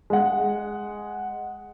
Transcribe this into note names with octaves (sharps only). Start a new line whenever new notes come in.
G#3 F#5